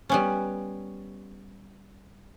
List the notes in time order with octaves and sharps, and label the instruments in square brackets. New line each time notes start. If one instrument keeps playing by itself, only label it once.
[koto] G3 B3 C#4